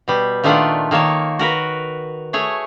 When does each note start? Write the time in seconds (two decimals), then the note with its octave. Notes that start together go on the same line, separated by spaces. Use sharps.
0.08 B2 G3
0.44 A#2 D#3 A3 D4 F4 F#5
0.91 D#3 A#3 C#5 A5
1.39 F#4 A#4 B4
2.33 A3 G#4 C#5